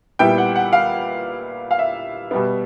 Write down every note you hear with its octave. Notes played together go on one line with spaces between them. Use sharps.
A#2 G3 B3 E4 G5
F#5
F#5
F5
F5
E5
B2 G3 B3